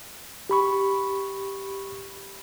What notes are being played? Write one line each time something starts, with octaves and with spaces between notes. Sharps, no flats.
G4 B5 C#6